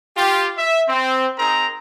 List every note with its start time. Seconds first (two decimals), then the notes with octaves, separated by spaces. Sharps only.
0.16 F4 G4
0.57 E5
0.88 C4
1.39 C4 D#4 G#4 A#4 A#5